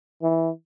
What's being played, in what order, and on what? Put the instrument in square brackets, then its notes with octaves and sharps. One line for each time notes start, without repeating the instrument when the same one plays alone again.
[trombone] E3